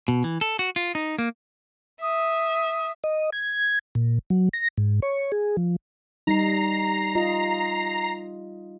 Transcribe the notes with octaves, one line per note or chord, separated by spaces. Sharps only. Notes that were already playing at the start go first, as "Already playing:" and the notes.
B2
E3
A4
F#4
F4
D#4
A#3
E5 D#6
D#5
G#6
A#2
F#3
A#6
G#2
C#5
G#4
F3
G3 D#4 A#5 C7
F4 D#5